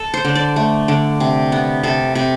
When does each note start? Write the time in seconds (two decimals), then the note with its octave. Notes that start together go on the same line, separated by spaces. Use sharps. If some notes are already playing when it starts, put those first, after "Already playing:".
Already playing: A4
0.14 C5
0.25 D3
0.35 D5
0.56 A3
0.88 D3
1.20 C3
1.52 B3
1.83 C3 A4
2.15 C3